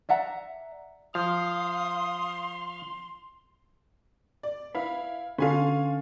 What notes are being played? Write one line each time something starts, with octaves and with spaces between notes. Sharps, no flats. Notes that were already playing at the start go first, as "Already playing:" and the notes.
D5 E5 F#5 A#5
F3 F5 C6 D#6
D5
E4 B4 F5
D3 C#4 A4 B4 F5 G#5 B5 C6